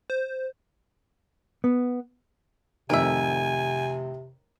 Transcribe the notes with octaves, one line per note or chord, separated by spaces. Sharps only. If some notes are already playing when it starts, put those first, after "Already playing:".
C5
B3
F2 A2 C3 D#3 A#4 E5 G#5